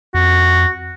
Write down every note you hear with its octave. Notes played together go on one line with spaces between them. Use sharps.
F2 F#4